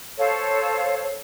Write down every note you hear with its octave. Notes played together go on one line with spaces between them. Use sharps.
A4 C5 C#5 F5